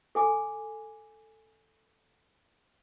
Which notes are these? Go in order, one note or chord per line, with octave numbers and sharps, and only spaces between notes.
A4 G#5 D6